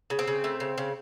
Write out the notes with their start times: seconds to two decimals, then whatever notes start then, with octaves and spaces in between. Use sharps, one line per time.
0.10 C#3
0.19 C4
0.28 C#3
0.44 A3
0.60 C#3
0.78 C#3